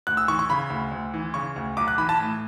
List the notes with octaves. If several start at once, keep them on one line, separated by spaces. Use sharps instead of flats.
D2 F#6
E6
E3 C#6
C#6
C#3 B5
D2
D2
E3
C#3 C#6
D2
B1 D6
F#6
E3 B5
A5
A2